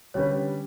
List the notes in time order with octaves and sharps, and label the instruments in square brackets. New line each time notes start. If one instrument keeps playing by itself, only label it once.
[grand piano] D3 G3 C#4 G4 B4 [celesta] C#5